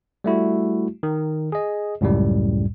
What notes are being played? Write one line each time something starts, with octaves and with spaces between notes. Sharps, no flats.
G3 A3 E4 F#4
D#3
G#4 D#5
C#2 F#2 A2 G3